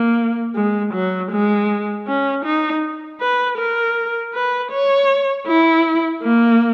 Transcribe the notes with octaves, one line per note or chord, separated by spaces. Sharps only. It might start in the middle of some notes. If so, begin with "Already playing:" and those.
Already playing: A#3
G#3
F#3
G#3
C#4
D#4
B4
A#4
B4
C#5
E4
A#3